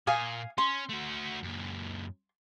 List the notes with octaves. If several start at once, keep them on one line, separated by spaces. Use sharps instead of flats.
A#2 F5 G#5 D#6
C#4 C6
A3 F#4
F#2 A#2